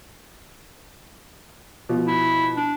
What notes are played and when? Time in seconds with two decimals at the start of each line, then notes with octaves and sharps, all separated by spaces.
1.89 B2 F3
2.07 E4
2.57 D4